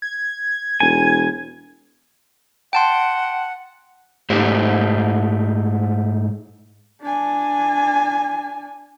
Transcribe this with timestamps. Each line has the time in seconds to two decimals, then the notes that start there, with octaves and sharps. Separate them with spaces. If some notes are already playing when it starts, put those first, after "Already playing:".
0.02 G#6
0.80 E1 G#5
2.73 F#5 G5 A5 C6
4.30 G#2 A3 G4 C5
7.02 D4 G#5